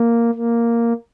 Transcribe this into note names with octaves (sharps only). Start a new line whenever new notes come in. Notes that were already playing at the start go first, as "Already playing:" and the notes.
Already playing: A#3
A#3